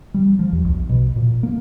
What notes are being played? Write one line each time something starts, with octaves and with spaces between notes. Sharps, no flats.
G3
F3
D#2
B1
B2
A#2
A#3